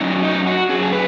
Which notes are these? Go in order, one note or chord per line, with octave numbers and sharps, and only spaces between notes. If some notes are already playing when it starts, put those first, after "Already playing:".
F#2 F#3 C#4 D#4
D#4
F#4
F#2 F#3 C#4 G#4
G#4
B4